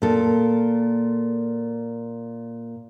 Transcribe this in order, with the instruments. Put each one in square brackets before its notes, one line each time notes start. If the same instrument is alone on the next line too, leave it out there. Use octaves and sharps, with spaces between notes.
[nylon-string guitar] A#2 A4